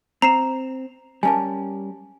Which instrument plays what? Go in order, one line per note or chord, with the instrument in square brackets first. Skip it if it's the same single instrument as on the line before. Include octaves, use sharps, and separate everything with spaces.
[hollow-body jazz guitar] C4 [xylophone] A#5 C7 E7
[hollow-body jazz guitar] G3 C#4 A#4 [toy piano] G#5 A5